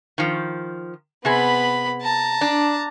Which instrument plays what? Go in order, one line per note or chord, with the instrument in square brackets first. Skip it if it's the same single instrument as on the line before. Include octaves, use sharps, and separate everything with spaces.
[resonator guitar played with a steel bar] D#3 F3
[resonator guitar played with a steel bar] C3 G#4 [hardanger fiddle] B3 B5
[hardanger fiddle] A5 A#5
[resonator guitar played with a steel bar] D4